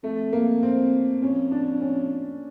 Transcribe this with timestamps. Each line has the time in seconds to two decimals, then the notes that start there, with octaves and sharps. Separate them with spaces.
0.03 F2 A3
0.33 A#3
0.63 C4
1.22 F2 C#4
1.51 D4
1.80 C#4